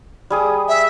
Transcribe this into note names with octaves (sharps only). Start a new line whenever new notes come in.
G3 G#4 D#6
E5